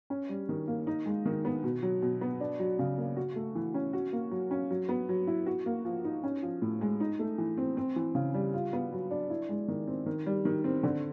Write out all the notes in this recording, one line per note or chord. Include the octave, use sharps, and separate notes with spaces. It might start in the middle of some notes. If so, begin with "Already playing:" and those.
C#4
G3
D#3
A#3
D#4
G#3
D#3
B3
B2
F#3
B2
B3
D4
F#3
C#3
A#3
F#4
A3
E3
C#4
F#4
A#3
F#3
C#4
F#3
B3
F#3
E4
F#4
A#3
F3
D#4
C#4
F3
A2
G#3
D#4
A3
E3
C4
C4
E3
C#3
G3
F4
B3
F#3
D4
E4
G#3
D#3
C4
D#3
G3
D#3
C4
D3